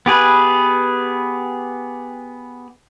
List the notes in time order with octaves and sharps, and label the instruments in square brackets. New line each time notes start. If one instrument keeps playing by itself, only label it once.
[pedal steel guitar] B3 G4 G#4 B4